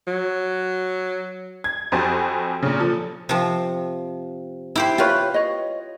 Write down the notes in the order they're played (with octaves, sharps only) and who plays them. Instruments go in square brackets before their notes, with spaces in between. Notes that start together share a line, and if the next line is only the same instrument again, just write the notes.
[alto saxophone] F#3
[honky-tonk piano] G#6
F2 F#4 G4 C5 G#5 A6
A#2 C#3
F3 A4
[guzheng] C3 F3
E4 G4 C5
[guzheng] F4 B4 [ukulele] G4 C#5 B5
[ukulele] C#5 D#5